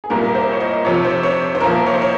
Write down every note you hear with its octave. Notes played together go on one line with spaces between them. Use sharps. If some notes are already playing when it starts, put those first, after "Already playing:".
G#4
C2 A#2 G3 A#3 A#4
A#4
C5
C#5
D#5
F2 C3 F3 C#5
C5
C#5
C5
C2 A#2 F3 A#3 A#4
C#5
C5
C#5